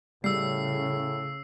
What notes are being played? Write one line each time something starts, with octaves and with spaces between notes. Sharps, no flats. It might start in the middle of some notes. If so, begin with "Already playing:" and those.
A2 C#3 G3 E6 C7